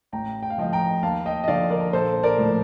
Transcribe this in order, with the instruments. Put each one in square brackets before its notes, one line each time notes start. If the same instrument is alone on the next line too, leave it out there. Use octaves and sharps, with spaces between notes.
[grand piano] A1 G5 A#5
G5
F5
A2 F3 D#5 G5
G5 A#5
D#2 F5 A5
D#5 G5
D#5
D3 F3 D5 F5
A#4 D5
A#1 A4 C5
A#4 D5
A2 F3